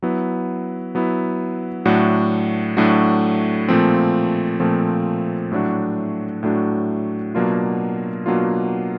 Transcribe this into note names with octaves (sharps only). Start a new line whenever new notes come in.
F#3 B3 E4
F#3 B3 E4
A2 F#3 A3 D4 F#4
A2 F#3 A3 D4 F#4
A#2 F3 A3 C4
A#2 F3 A3 C4
A2 F#3 A3 D4 F#4
A2 F#3 A3 D4 F#4
B2 F#3 A#3 D4 F4
B2 F#3 A#3 D4 F4